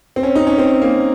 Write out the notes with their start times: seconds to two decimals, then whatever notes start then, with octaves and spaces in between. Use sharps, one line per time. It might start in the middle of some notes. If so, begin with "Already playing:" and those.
0.16 C4
0.23 C#4
0.35 D#4
0.47 C#4
0.58 C4
0.82 A#3